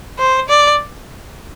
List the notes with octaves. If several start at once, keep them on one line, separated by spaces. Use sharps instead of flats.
C5
D5